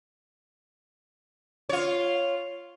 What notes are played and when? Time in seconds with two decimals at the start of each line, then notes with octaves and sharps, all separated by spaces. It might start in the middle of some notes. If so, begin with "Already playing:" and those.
1.69 F4 C#5